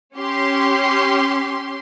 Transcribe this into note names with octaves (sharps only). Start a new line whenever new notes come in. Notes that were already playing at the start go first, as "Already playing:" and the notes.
C#4 G4 C6